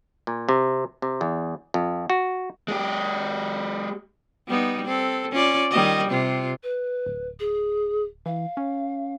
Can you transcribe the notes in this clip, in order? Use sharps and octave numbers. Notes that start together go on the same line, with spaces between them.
A#2
C3
C3
E2
F2
F#4
G#3 G4
G3 B3 D#4
C4 A4
C#4 F4 D5
D#3 G3 D#5
C3 F4
B4
D1
G#4
E3 F5
C#4